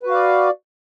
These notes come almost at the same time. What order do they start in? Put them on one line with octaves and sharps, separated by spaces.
B4 F#4 F5 D5